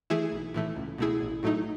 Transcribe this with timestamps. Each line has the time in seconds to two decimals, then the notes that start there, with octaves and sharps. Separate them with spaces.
0.10 E3 A3 E4 G#4
0.32 B1
0.54 A2 E3 A3
0.76 C#2
0.98 B2 A3 E4 G#4
1.21 A1
1.43 A2 F#3 A3 D#4